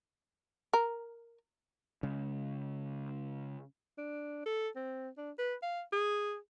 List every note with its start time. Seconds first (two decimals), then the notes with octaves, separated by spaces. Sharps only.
0.73 A#4
2.03 C#3 G#3
3.98 D4
4.46 A4
4.76 C4
5.18 D4
5.39 B4
5.62 F5
5.92 G#4